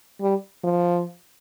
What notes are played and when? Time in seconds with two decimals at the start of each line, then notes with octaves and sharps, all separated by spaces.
0.21 G3
0.64 F3